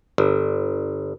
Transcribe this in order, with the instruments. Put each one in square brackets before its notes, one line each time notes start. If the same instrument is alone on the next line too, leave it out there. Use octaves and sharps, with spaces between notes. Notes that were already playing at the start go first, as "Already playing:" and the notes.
[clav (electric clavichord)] G1